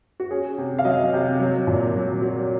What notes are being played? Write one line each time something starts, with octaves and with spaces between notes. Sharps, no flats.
F#4
C#4 G#4
C3
F5
F#3 D#5
C3
F#3
A#2
F#3
F#3